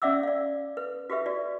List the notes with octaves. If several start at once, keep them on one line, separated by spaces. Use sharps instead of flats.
C#4 D5 E5 F#5 D6 E6
D5 F5
B4
F#4 G4 B4 E5
F#4 D5